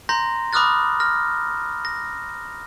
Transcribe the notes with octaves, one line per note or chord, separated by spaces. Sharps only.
A#5 C6 G6 A#6
B5 D6 D#6 F6 F#6 A6
F6 A#6
A#6